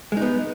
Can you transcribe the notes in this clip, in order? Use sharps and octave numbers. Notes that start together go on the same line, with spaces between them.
G#3 B3 D#4